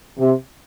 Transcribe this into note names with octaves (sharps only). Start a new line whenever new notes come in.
C3